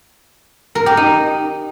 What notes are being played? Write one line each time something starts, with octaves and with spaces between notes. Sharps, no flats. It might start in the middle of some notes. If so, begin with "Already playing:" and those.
A#4
G4
D#4